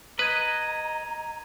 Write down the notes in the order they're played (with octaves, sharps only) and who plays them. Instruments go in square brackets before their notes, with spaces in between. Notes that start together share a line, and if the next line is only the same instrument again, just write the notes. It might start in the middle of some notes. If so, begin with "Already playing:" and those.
[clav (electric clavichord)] B4 [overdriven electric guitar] D#5 [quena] A#5 [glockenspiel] G#6 B6 D#7